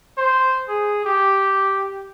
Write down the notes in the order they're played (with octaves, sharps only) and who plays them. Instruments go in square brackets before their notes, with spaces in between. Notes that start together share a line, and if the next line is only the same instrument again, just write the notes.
[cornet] C5
G#4
G4